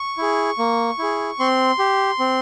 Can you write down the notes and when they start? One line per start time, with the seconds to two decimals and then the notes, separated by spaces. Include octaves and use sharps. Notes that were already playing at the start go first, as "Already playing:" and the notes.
Already playing: C#6
0.18 E4 G#4
0.58 A#3
0.99 E4 G#4
1.39 C4 C6
1.79 G4
2.19 C4